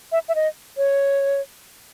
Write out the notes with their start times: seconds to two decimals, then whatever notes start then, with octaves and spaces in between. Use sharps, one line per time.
0.12 E5
0.28 E5
0.35 D#5
0.77 C#5